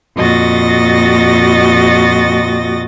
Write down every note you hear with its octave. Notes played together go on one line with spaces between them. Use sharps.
F2 A#2 F#4 D#5 A6 A#6